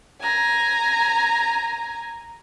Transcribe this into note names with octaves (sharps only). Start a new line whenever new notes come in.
G#5 A#5